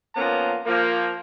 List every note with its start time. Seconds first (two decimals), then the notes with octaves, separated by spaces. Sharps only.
0.16 A#2 F3 A#3 B3 C#4 A#5
0.66 F3 A#3